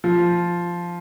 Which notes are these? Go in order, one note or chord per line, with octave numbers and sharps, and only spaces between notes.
F3